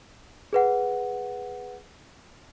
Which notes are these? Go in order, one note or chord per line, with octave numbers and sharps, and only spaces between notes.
G#4 B4 F#5